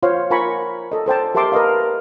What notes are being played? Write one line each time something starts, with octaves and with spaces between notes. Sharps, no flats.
F4 C5 C#5 F5 C6
F4 A#4 G#5 A#5 B5 C#6
A4 D#5
A4 C5 G5 A5
G4 A#4 E5 A5 C6 D6
A#4 B4 D#5 F5